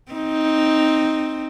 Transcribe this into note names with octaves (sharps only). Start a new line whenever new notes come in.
C4 D#4